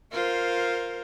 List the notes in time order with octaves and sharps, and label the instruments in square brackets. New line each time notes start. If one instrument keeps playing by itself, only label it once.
[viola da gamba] F4 A#4 C5